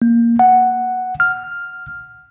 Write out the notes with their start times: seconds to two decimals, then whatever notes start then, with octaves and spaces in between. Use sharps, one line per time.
0.02 A#3
0.39 F#5
1.20 F6